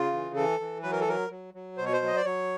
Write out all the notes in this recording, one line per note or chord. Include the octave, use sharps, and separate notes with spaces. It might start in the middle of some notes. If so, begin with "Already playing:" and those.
Already playing: C#3 F4
E3
E3 A4
E3
F#3 B4
A#4
A4
F#3 A#4
F#3
F#3
B2 C5
C#5
C5
F#3 D#5
D5
F#3 C#5